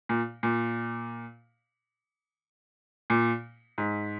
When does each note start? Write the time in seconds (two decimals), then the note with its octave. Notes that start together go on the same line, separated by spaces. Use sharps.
0.09 A#2
0.43 A#2
3.10 A#2
3.78 G#2